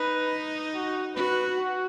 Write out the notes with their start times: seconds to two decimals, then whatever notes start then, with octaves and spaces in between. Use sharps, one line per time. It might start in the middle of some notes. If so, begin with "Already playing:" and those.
Already playing: D#4 B4
0.74 F#4
1.16 F#4 B4
1.58 F#4